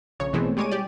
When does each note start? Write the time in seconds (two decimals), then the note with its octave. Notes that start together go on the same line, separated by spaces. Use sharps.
0.20 A#1 C#3 C#5
0.33 B2 E3 G#3 A3 C4
0.57 G3 G#3 C#5 G#5 D6 D#7
0.71 G4 D5